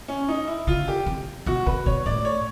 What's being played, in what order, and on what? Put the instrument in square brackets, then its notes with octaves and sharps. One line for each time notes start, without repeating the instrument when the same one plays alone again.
[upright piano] C#4
D#4
E4
[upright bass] C#3 [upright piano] F4
[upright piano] G4
[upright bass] C3
[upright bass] B2 [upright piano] F#4
[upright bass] C3 [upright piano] B4
[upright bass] B2 [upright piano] C#5
[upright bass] A2 [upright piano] D5
[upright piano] C#5